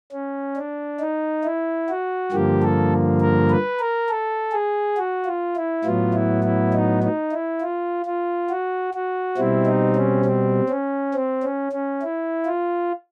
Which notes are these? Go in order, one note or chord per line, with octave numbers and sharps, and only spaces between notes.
C#4
D4
D#4
E4
F#4
G2 D3 F3 A#3 G4
A4
A#4
B4
A#4
A4
G#4
F#4
F4
E4
A2 F#3 B3 F4
E4
E4
D#4
D#4
E4
F4
F4
F#4
F#4
B2 G3 C4 E4
D#4
C#4
C4
C#4
C4
C#4
C#4
E4
F4